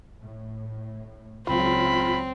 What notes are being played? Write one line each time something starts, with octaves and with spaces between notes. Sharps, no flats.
A2
C#2 C#3 F#3 C4 F4 B5